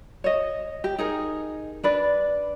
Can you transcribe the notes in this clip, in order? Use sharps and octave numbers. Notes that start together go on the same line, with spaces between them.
C#5 D#5
G4
D#4 G#4 A#4
D4 B4 D5